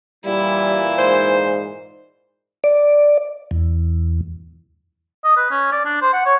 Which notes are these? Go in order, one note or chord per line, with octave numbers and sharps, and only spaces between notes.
A#2 E3 G3 E4
G#2 C5
D5
E2
D#5
B4
C#4
D5
D4
C5
F#5
C#5